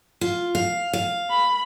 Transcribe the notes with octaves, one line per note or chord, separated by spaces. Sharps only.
F4
F5
F5
B5